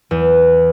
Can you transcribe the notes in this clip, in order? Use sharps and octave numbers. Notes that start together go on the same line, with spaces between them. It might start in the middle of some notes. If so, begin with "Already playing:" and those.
E2